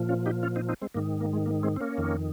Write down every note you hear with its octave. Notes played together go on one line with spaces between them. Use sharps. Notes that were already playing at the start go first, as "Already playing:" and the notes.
Already playing: A#2 F3
C#4 F4
D#4 G4
C#4 F4
C4 D#4
C4 D#4
G#3 C4
G#2 D#3 A#3
A#3
G#3
A#3
G#3 C4
C4
A#3 C#4
F2 D#3